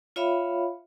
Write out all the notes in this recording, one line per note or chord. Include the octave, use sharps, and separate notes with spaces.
F4 C#5 E5 F5 B5